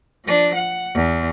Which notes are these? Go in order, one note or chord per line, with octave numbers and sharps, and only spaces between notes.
F3 D4
F#5
E2